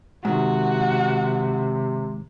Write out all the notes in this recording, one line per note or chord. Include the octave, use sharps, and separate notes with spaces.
G#2 C3 D#3 F#4